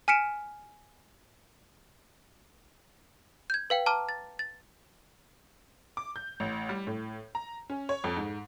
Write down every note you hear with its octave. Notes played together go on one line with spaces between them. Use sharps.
G#5 F6 B6 C#7 D7 E7
G6 G#6
B4 F5 G5
A5 A#5 D6 F6
A6
A6
D6
G6
A1
G3
A2
A#5
C#4
C#5
F2
G#2